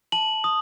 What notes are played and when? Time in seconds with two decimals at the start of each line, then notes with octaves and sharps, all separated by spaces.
0.12 A5 F#7
0.44 D#6